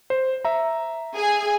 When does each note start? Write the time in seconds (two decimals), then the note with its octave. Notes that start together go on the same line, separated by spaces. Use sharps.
0.10 C5
0.45 E5 A#5
1.15 G#4 G#5